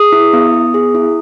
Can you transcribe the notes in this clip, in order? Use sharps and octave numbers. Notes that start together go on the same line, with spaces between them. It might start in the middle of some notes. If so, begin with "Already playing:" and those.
Already playing: G#4 D#6
E4
B3
B3
G#4
E4